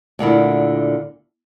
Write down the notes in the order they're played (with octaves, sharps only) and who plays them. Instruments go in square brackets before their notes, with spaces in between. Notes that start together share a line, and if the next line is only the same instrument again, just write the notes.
[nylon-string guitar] D2 A#2 D3 E4